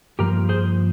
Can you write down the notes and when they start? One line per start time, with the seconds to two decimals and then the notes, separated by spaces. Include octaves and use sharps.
0.19 G2 F3 A#3 G4 A#4
0.49 G#4 C5